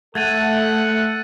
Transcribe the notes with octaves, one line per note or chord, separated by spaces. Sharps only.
A3 A4 F#5 G#6 A6 D#7